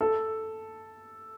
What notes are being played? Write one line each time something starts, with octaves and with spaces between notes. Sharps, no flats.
A4